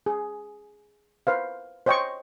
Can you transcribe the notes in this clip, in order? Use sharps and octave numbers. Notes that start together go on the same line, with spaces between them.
G#4
B4 C5 F5
C5 C#5 D#5 G5 C6 C#6